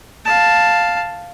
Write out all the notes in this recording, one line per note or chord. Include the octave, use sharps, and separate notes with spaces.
F5 A5